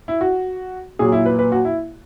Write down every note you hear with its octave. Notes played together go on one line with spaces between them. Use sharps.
E4
F#4
A#2 F#3 G#4
E4
B4
B4
F#4
E4